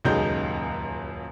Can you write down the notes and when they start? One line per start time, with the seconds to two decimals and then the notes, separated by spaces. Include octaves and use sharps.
0.05 D#1 C#2 F#2 D#4 G#4 G6